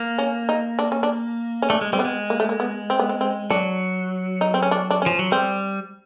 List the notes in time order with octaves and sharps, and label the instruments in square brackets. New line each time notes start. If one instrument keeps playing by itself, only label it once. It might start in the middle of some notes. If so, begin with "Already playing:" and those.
Already playing: [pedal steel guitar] A#3
[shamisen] C#4
D#4
D4
C#4
D4
C#4
[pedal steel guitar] A3 [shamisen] D4
[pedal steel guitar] G#3
[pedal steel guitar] G3 [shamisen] C4
[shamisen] B3
[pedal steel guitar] G#3
[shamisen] A#3
A3
A#3
B3
C4
B3
C4
C4
[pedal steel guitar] F#3 [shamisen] D4
[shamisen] D#4
C4
C#4
D4
D4
C#4
[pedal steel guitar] F3
F#3
[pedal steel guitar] G3 [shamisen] C4